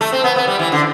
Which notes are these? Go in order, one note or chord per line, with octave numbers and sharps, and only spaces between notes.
A3
C4
B3
B3
G3
E3
D3